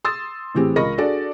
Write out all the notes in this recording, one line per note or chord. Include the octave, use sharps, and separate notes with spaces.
C6 D#6 E6 A6
A2 E3 C4 G4 G#4
C#2 A#4 D#5 B5 C#6 A#6
D4 F#4 G#4 A4 D5